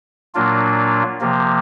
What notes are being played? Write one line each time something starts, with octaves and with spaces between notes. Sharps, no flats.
A#2 F#3 A#3 D4 F4
C3 F3 A#3